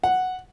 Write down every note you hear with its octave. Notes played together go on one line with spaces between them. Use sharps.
F#5